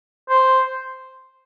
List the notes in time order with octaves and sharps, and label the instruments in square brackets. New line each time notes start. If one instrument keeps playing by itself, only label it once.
[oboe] C5